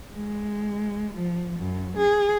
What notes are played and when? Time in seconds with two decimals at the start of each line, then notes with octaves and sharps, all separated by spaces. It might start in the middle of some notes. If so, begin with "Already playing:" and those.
0.13 G#3
1.14 F3
1.59 F#2
1.97 G#4